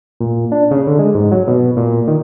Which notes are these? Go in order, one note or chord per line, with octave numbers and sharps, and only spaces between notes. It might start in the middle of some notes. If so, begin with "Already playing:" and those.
A#2
D4
C#3
D3
G#3
G#2
F#3
B2
A#2
D#3